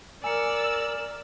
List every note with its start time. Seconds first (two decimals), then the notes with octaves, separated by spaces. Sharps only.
0.24 A#4 D5 G#5 A#5 E6 C#7